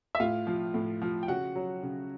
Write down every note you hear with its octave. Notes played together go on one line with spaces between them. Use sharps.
E5
A2 F4 F5
F3
A2
F3
G5
C#3 F#4 F#5
F#3
C#3